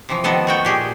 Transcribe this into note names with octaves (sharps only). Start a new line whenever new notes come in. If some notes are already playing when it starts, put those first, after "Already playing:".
C3 E3 F3
D#3 F3 B3 A4 D#5
A3 F#4 G5
A#2 G4 G#4